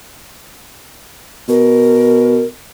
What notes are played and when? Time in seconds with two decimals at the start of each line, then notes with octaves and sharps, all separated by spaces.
1.49 B2 A#4